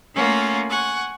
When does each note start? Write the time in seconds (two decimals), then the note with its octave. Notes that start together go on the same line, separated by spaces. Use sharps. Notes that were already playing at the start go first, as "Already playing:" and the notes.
0.15 A3 A#3 C#4 F4 F#5
0.69 F#5 G#5 C#6